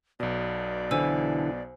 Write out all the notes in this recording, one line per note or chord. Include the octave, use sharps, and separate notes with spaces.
B1 B2 D5
D3 E3 C5 G#5 E6